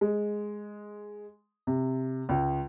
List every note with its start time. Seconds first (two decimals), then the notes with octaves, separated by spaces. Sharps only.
0.01 G#3
1.67 C3
2.29 C#2